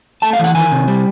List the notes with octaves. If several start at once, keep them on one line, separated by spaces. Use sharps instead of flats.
A3 A5
F5
E3 F#5
D#3 G#5
C3
G3